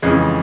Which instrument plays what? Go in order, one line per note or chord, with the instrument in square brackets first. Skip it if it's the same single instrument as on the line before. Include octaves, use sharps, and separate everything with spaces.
[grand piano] F2 C#3 E3 G#3